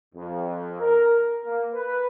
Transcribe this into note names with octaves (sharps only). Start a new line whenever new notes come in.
F2
A#4
A#3
B4